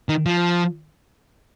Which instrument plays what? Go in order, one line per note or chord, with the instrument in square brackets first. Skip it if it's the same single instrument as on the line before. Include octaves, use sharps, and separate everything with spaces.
[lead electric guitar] D#3
F3